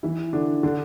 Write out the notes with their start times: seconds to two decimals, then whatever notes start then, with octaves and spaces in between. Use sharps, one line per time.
0.03 E3 E4
0.33 D3 D4
0.63 D3 D4